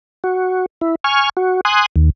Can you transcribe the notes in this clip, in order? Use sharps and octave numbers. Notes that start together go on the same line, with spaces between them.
F#4
E4
G#5 C#6 F6
F#4
G#5 C6 D#6 F#6
D#2